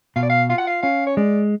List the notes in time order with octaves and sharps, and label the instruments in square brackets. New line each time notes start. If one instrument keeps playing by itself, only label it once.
[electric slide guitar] B2 [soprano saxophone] F5
[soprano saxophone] D5
F5
[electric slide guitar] F4 [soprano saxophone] F5
[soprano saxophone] F#5
F5
[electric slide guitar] C#4 [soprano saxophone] F5
[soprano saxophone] C#5
[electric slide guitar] G#3 [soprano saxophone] D5